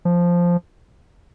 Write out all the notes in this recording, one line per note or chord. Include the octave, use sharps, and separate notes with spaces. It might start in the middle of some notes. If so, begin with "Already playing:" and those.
F3